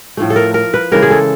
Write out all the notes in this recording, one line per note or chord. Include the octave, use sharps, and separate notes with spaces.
A2 F3 A3
A4
A#4
A#4
B4
C#3 E3 G#3 A#4
G#4
A4